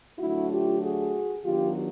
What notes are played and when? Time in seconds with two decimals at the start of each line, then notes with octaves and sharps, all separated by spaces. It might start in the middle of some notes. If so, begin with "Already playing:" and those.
0.19 D3 F#3 A3 D4 E4 F#4
0.51 F4 G4
0.82 F#4 G#4
1.44 D#3 F#3 B3 D4 F4 G4